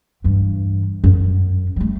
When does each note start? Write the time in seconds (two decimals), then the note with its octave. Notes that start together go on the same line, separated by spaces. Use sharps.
0.24 G2 E3
1.04 F#2
1.76 G3 A3